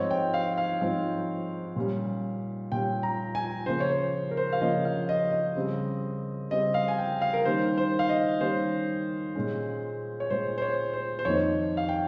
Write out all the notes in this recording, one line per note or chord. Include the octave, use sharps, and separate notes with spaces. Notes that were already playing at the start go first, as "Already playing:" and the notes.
Already playing: G#2 F3 C4 D#4 C#5
G5
F5
F5
G#2 F3 C4 D#4
A#2 G3 C#4
A#2 G3 C#4 G5
A#5
G#5
C#3 F3 A#3 C#4 C5
C#5
C5
A#4
C5
F5
C#3 F3 A#3 C#4 D#5
F5
D#5
D#5
C#3 G3 C4
C#3 G3 C4 D#5
F5
G#5
G5
F5
A#4
D#3 G3 A#3 C#4 C5
C5
F5
D#5
D#3 G3 A#3 C#4 C5
A#2 G#3 C#4
C#5
A#2 G#3 C#4 C5
C5
C#5
C5
C5
F2 D#3 A#3 D#4 C#5
F5
G5